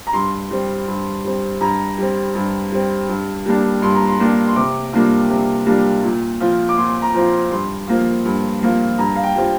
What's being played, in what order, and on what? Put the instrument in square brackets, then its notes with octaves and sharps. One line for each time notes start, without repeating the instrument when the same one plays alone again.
[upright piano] A#5
G2 C6
G3 C4
G2
G3 C4
G2 A#5
G3 C4
G2
G3 C4
G2
G3 A#3 D4
G2 C6
A#5
C6
G3 A#3 D4
C6
C3 D6
G3 A#3 D4 F4
C3
G3 A#3 D4 F4
A#2
F3 C4 F4
D6
A#2 C6
A#5
F3 C4 F4
C6
G2 C6
F3 A#3 F4
G2
F3 A#3 F4
G2 A#5
F5
G5
G3 C4 F4